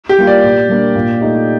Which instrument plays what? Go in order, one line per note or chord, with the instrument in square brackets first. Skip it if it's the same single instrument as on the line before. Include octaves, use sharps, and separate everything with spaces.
[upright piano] G4
[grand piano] G3 A#3 F4
[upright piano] D5
[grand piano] A#2
G3 A#3 D4
A#2
A3 D#4 G4